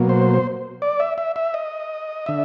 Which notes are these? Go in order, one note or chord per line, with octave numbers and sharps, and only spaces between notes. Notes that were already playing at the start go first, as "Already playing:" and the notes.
Already playing: B2 F#3 A#3
C5
D5
E5
E5
E5
D#5
D3 E5